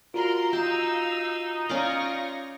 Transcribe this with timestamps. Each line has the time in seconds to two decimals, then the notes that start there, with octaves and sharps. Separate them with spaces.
0.14 F4 F#4 A#4 D5 A#5 C6
0.53 D#4 G4 F5 E6
1.69 C#4 F4 D5 F5 C#6 A#6